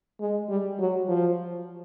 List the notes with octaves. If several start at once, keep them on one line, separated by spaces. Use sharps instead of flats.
G#3
G3
F#3
F3